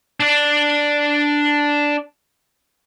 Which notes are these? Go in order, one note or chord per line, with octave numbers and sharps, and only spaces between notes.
D4 D5